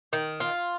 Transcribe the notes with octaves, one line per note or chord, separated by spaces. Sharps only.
D#3
F4